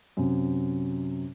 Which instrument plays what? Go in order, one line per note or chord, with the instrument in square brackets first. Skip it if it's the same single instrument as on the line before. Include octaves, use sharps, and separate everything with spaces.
[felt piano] F#2 C3